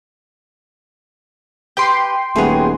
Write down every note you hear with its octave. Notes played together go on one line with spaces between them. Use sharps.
G4 B4 G5 C6
D#1 F#3 A3 B3 G#4